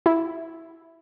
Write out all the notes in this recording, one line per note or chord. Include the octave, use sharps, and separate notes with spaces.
E4